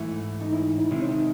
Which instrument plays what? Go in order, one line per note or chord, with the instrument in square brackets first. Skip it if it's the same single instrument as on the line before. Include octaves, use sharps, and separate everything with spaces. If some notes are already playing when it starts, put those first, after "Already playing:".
Already playing: [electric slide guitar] G#2 E3 A3 [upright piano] E4
[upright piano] D#4
E4
E4
[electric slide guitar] C3 D#3 G#3 C4 [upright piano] E4
[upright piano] C#4
D#4